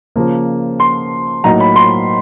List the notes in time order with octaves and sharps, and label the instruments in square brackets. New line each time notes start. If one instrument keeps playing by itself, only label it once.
[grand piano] C#3 F3 A#3
C6
A2 F#3 A#3 D#4 A#5
B5
C6